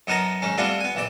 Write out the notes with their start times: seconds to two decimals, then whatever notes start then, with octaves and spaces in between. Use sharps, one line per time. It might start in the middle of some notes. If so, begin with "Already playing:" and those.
0.07 F#2 B3 D#4 A#4 A5 A#5
0.42 G#2 D#3 C#4
0.58 G3 A3 B3 C4 D4 F4
0.80 B3 G#5
0.95 A#1 E3 D5